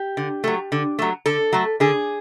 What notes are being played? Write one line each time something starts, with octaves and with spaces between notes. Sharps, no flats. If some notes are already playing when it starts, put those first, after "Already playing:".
Already playing: G4
D3
F#3 A3
D3
F#3 A3
D3 A4
F#3 A3
D3 G#4